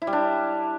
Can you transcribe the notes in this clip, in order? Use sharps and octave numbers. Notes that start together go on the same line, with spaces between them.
E4
G3
D4